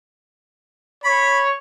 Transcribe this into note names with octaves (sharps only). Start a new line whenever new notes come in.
C#5 B5